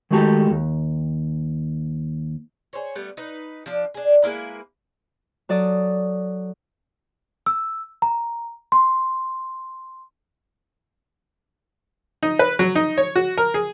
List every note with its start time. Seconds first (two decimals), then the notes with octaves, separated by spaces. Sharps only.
0.11 D#3 G#3 A3 F#4 G4 A4
0.50 D#2
2.73 G#4 C5 C#5
2.95 G3 A3 B3
3.17 D#4 B4
3.66 F3 D4
3.94 D4 G#4
4.22 G#3 A#3 E4 B4
5.49 F#3 A4 D5 D#6
7.46 E6
8.02 A#5
8.72 C6
12.23 D#4
12.39 B4
12.59 F#3
12.75 D#4
12.98 C#5
13.16 F#4
13.38 A#4
13.54 G#4